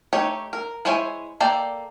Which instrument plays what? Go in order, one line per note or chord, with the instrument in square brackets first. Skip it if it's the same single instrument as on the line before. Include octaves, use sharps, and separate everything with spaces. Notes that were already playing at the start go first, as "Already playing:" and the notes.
[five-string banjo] A3 D#4 G4 C#5
A#4
G#3 E4 C5 C#5 G#5
A#3 A4 D5 G5